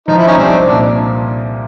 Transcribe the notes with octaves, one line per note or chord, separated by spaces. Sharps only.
F3 D#4
E4
C#4 D#4
C2 C4 D4
A#2 D4